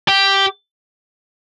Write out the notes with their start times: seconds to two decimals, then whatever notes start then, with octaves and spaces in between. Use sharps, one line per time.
0.08 G4